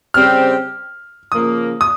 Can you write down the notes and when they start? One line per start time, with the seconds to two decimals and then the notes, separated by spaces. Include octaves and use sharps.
0.14 C#3 G3 C4 G4 F6
1.32 C#3 F3 A#3 D#6
1.81 D#6